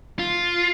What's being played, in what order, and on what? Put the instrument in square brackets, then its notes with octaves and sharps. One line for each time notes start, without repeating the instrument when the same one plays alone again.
[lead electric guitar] F4